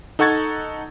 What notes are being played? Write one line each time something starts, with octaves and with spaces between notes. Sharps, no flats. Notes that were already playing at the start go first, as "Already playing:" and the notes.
D#4 A4 F#5 C#6 G#6 A6